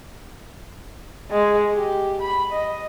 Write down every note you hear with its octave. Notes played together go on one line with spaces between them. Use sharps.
G#3
G4
B5
D#5